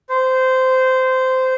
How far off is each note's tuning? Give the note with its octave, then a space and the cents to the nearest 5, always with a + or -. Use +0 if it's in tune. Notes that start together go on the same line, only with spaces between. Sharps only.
C5 -15